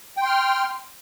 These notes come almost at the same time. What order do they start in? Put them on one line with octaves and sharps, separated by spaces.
G5 C6 F6